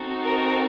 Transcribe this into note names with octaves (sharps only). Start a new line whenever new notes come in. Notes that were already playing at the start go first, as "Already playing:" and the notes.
Already playing: C4 D#4 F#4 A4
A#4